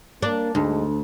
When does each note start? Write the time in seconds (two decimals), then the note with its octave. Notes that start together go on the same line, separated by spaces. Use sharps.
0.22 A#3 D4
0.55 D2 G#2